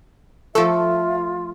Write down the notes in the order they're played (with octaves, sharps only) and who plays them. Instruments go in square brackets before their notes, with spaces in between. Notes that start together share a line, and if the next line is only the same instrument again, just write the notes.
[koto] F3 A3 [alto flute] F4 [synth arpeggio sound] A4 [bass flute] E5